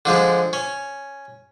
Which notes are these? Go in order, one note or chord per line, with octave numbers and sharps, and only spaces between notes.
D3 F3 G#3
C#4